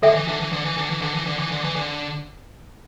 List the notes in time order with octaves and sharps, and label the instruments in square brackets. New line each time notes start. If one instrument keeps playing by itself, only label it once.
[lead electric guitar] D3 [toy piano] A4 E5 G5
[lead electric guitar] E3
D3
E3
D3
E3
D3
E3
D3
E3
D3
E3
D3
E3
D3